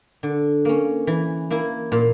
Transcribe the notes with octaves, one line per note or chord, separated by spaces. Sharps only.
D3
A#3 C#4
E3
A#3 E4
A#2